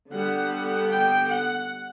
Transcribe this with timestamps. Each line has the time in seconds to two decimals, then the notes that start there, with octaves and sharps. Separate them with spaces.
0.11 D3 G3 B3 F#5
0.89 G5
1.28 F#5